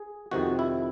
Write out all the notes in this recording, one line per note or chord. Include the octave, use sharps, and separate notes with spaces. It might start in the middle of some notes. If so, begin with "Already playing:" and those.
Already playing: G#4
F2 C3 D#3 F#4
E4